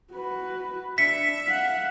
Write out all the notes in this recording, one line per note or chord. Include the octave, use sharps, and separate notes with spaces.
F#4 B4
D4 E5 B6 C#7
F5 F#5